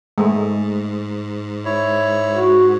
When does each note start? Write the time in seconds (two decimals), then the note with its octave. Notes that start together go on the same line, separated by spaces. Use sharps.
0.18 G#2 G#3 A3
1.65 E4 C#5
2.34 F#4